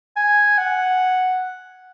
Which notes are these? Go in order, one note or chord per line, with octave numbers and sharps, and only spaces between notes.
G#5
F#5